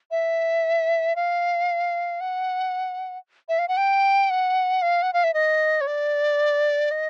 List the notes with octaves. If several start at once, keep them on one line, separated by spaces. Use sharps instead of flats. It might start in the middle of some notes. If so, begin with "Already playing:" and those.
E5
F5
F#5
E5
F5
F#5
G5
F#5
F5
F#5
F5
E5
D#5
C#5
D5
D#5